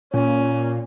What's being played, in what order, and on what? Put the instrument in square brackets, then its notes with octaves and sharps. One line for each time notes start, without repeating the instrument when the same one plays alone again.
[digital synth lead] A#2 [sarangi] C#4